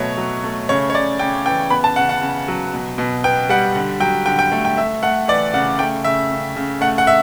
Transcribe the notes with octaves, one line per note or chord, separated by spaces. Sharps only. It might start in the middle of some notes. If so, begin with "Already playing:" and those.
Already playing: B2 F#3 A3 C#5
F#3
A3
C#3 C#5
C#5
C#3 D5
C#3 G5
E3 G5
B3 B5
A5
C#3 F#5
F#5
C#3
F#3
B2
B2
B3 G5
G3 F#5
D3
F#3 G5
D3 G5
G5
A3
G5
A3 E5
A3 F#5
E3 D5
C#3 F#5
A3 G5
C#3 E5
C#3
C#3
A3 F#5
F#5
E5